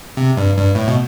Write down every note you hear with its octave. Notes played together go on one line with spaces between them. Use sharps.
C3
G2
G2
A2
B2